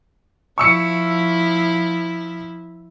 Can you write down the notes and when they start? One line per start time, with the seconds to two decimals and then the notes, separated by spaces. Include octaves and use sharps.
0.58 F3 E4 C#6 E6 C#7